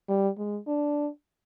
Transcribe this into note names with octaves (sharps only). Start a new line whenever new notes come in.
G3
G#3
D4